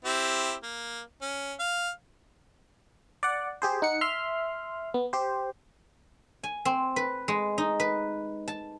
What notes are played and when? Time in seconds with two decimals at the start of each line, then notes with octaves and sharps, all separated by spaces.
0.05 C4 E4 G4
0.63 A#3
1.22 C#4
1.59 F5
3.23 D5 F#5
3.62 G4 G#4 C5
3.82 D#4 F#5 C#7
4.01 E5 C6 F6
4.94 B3
5.13 G4 C5
6.43 G#5
6.65 C4
6.96 B4
7.28 G#3
7.58 D#4
7.80 B4
8.48 A5